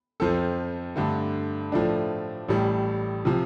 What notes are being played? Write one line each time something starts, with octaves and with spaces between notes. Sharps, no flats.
F2 F3 C4 A4
G2 D3 A3
A2 F3 A3 D4
A1 A2 G3
C3 F3